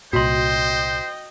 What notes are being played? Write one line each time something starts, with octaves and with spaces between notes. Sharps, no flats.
C2 A#2 F#4 C5 D#5 G5 C6